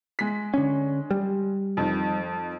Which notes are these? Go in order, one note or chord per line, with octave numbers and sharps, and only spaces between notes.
G#3 B6
D3 C#4
G3
F2 D#3